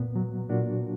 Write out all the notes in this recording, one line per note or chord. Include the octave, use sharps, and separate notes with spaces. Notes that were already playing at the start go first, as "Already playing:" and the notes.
Already playing: A#2 B3
F#3
A#2 D4 F#4